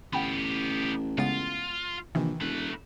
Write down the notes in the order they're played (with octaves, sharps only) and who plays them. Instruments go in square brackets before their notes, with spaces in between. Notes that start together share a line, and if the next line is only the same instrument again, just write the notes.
[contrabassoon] A1 [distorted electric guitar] B3 G4 [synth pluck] F#5 G5 B5
[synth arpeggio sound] C#3 A6 [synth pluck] G#3 B3 F#5 [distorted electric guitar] F4
[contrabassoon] A#1 [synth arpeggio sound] C3 D#3 E3
[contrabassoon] E1 [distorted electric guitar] A3 B4